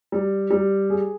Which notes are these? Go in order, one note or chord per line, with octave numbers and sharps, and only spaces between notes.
G3
G3
G#4